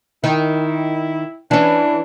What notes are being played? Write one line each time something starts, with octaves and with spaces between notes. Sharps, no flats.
D#3 E4
E3 C#4 D4